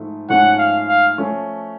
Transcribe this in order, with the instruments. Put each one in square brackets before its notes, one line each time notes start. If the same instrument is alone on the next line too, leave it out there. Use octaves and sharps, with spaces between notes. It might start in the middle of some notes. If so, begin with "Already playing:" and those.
Already playing: [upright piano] G#2 F3 A3
[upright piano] G#2 F3 A3 C#4 [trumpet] F#5
[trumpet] F5
F5
[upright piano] F3 A3 C#4